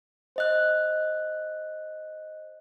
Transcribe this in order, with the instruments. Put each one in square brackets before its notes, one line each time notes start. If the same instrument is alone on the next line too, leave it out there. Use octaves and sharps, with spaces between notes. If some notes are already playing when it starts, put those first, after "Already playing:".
[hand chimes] C5 D#5 F#6